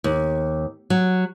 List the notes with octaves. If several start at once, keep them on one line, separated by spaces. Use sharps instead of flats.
D#2
F#3